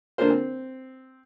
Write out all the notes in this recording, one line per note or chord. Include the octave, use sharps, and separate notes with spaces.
D3 A#3 D4 F4 A#4 C5
C4